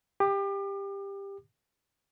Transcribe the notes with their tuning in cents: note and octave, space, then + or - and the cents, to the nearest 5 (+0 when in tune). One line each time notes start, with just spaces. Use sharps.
G4 +15 D6 +35